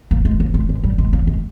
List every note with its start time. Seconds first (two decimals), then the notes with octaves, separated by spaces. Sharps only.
0.11 A#3
0.25 G#3
0.40 A#3
0.54 G#3
0.69 G#3
0.83 G3
0.98 G#3
1.13 A#3
1.27 G#3